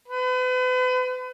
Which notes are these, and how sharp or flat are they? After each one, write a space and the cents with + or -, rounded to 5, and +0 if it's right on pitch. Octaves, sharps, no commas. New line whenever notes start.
B4 +40